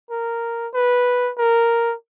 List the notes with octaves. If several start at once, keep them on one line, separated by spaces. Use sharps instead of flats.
A#4
B4
A#4